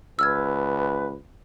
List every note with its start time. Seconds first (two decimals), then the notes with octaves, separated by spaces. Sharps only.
0.19 C#2 B4 E6 F6 G#6